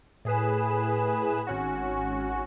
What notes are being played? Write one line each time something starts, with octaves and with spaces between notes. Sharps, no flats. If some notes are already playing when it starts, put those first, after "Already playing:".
A2 G#4 B4 E7
G#1 C#4 F#4